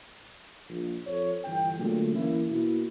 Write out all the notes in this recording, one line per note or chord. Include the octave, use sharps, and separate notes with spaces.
A#1
F2 A4 C5 C#5
G1 E3 G5
A#2 D3 F#3 G#3 A3
E3 A#3 C#4 E4
B2 A#3 E4